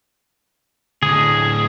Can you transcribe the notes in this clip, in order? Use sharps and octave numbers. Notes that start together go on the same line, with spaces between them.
D2 A2 G#4